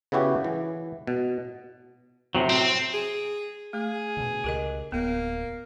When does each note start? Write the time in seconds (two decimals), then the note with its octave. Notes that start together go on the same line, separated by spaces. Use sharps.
0.12 C#3 B3 E4 F#4 G4
0.44 E3
1.07 B2
2.35 A2 C3 F#3
2.50 C4
2.94 G#4
3.73 A3 G#4
4.17 B2 D3
4.44 C#2 G4 A#4 D#5
4.92 D1 A#3 B3